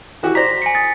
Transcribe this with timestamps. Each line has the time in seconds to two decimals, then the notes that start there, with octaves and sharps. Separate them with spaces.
0.23 E3 F#4 G4
0.35 C5 D5 A#5 A#6 B6
0.62 G#5 C#7
0.75 D#6 A6